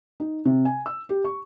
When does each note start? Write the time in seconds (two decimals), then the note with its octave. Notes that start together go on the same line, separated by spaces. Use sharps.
0.20 D#4
0.45 C3
0.65 G#5
0.86 E6
1.09 G4
1.25 C#6